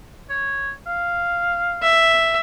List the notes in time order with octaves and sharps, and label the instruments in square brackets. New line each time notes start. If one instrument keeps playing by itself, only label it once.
[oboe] C#5
F5
[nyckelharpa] E5